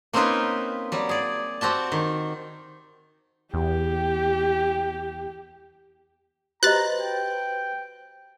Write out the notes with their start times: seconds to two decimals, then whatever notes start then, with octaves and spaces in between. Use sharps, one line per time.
0.13 A#3 C4 C#4 D#4 F4 B4
0.92 F#3 G3
1.09 G#4 D5
1.61 C4 F#4 G4 A5
1.92 D#3
3.54 E2 G4
6.63 F#4 G4 B4 C5 D#5 A#5 F#6 A6
7.01 G5